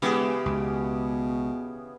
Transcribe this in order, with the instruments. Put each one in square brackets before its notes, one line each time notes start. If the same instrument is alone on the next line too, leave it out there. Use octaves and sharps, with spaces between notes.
[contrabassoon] E1 [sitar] C#3 E3 G4 [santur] B3 G#4
[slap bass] C#2 [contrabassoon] B2